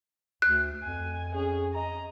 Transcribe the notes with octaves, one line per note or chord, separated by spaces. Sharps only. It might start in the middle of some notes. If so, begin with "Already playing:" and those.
D2 F#6
F2 G#5
C#4 G#4
D#5 A#5